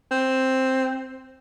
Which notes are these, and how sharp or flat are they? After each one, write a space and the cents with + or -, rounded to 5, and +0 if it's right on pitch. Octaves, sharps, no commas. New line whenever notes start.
C4 +5